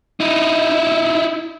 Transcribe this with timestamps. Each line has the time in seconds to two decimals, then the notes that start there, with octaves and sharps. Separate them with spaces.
0.20 D#4 E4